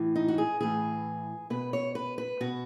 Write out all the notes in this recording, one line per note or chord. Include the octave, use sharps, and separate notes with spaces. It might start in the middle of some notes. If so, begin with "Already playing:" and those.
Already playing: A2 E3
D#4
F#4
G#4
A2 E3 G#4
B2 B4
C#5
B4
B4
B2 F#4